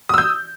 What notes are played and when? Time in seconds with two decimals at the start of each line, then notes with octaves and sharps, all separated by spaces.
0.09 D#6
0.14 E6
0.18 G6